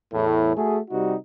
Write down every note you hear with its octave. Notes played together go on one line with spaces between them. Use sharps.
E2 A2
A3 F#4 G#4
C3 G3 D#4 F#4